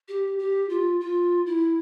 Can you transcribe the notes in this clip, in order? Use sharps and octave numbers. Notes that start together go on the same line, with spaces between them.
G4
G4
F4
F4
E4